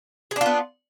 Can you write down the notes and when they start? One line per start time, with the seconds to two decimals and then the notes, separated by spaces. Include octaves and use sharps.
0.31 G#4
0.36 D4
0.41 F4
0.46 B3